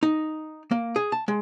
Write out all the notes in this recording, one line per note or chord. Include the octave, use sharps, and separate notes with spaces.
D#4
A#3
G#4
A5
G#3